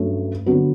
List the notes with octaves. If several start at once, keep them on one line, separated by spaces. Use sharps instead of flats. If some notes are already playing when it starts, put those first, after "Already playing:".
Already playing: G2 F#3 A3 C#4
D3 F#3 B3 F#4 B4